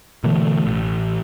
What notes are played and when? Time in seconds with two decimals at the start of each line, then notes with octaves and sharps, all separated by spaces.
0.24 B2 D3 E3 A3
0.66 A1